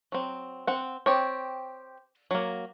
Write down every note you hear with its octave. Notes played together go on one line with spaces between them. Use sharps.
F#3 C4
C4 F#5
C4 G4 C#5
F#3 A#3